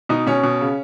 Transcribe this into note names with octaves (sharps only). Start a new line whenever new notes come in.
B2 D#4
B2 C#4
B2
C#3